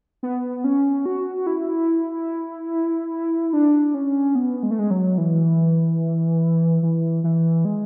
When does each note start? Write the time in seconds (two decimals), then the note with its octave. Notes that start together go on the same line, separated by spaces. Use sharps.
0.23 B3
0.64 C#4
1.06 F#4
1.47 E4
3.53 D4
3.94 C#4
4.35 B3
4.63 G#3
4.71 A3
4.79 G#3
4.91 F#3
5.18 E3
6.82 E3
7.24 E3
7.65 G#3